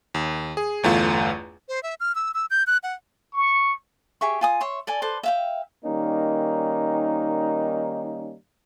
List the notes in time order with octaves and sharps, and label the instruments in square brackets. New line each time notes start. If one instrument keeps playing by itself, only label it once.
[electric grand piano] D#2
G#4
G1 E2 A3 F4
[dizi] C5
E5
F6
E6
E6
G6
F#6
F#5
[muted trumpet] C#6
[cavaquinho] G4 G#4 E5 C#6
F4 G#5 D#6
C#5 E5 C6
A4 D5 G#5 A5
A4 B4 C5 D6
E5 F5 G5
[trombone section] D#3 G3 A#3 C#4 D#4